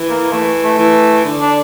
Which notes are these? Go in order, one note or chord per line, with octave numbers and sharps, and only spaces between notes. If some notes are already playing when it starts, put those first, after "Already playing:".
Already playing: E3
A#3
E3 A3
A3
E3
D3
D4